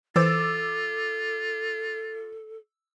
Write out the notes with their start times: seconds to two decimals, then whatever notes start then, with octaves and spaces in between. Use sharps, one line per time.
0.16 E3 F4 A4 C5 D6 E6 A6